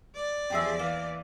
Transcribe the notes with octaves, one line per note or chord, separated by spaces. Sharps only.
D5
E2 F3 G4 G#4 E5
E3 A#3